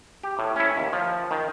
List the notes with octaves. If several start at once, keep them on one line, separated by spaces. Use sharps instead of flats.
G4
A2
C#4 E4
D#2
F3
D#3